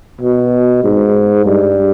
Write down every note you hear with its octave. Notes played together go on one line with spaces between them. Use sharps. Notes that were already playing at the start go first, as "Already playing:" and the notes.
B2
G#2
G2